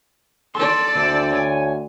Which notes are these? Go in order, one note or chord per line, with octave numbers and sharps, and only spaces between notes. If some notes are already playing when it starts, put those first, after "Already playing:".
A4 D5 C6
D2 D3 C5
C#5 G#5